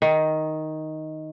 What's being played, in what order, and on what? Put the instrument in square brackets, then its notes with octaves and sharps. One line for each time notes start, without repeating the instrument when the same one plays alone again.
[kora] D#3